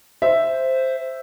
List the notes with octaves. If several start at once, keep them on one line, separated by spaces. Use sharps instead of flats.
C5 E5